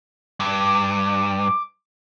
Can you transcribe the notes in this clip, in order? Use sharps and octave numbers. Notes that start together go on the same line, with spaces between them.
G2 D6